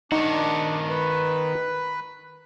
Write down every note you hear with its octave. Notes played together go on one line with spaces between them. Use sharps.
D#3 D4 D#4 F#4
B4